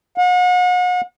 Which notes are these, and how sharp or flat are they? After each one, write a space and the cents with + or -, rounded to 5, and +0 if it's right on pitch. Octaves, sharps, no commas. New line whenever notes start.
F#5 -40